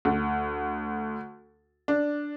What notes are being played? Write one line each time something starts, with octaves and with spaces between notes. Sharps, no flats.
D2
D4